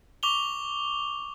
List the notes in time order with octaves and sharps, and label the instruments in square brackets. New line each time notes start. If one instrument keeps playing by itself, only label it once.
[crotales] C#6 D6 F7 G7